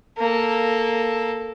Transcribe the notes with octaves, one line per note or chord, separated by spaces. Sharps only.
A#3 A4